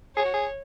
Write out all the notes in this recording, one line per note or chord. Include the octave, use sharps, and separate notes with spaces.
G#4 C#5
F#4
G#4